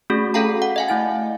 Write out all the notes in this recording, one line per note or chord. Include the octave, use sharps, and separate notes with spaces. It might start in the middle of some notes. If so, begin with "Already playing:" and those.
A3 C#4 F#4 G#4
C#4 F#4 A4 F5 G5 A#5
F#5
D#5 F5 G#5
A3 E4 A6